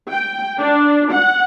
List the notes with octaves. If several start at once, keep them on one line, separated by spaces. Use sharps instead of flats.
G5
D4
F#5